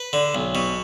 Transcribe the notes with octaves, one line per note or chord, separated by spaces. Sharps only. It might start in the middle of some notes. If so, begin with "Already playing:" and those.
Already playing: B4
D3
B1
B2